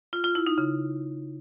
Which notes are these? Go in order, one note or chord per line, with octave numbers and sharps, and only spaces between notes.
F4
F4
E4
D#4
C#3